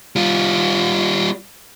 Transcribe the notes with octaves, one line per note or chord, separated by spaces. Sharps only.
G3 F4